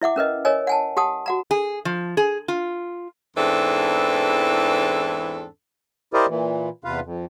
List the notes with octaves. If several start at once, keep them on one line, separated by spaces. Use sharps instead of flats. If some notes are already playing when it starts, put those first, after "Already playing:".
E4 E5 F#5 D6
C#4 A#4 B4 D#5
A#4 C#5 D#5 G#5
F#5 G#5 A5
G4 F#5 A5 D#6
F#4 F#5 A#5
G#4
F3
G#4
F4
E2 G#2 E3 C4 D4 A4
E4 G4 A#4 C5 D5 D#5
A#2 E3
E2 C3 F4 B4 F5
F2